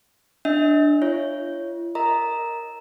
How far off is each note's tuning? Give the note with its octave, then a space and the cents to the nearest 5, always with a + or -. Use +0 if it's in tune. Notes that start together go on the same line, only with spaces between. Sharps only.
D4 +0 D#5 +40
F4 -45 C#5 +0
A#4 +0 D#5 +0 A#5 +0